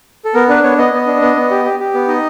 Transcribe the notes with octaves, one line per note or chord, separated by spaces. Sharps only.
A4
B3 A#4
D4 B4
B3 C#5
B3 D#5
B3
D4
B3
B3
G4
G4
G4
B3
D#4 D#5